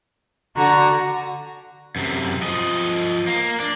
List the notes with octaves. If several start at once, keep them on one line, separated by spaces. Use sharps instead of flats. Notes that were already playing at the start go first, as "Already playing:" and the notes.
D3 F#4 A#5
F#2 C3
F3 D#5
A#3
D4